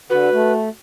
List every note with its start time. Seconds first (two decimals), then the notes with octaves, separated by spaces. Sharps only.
0.10 D3 F#4 B4
0.33 A3